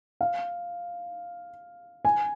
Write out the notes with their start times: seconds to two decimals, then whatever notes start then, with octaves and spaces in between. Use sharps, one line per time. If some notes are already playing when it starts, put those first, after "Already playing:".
0.21 F5
2.05 G#5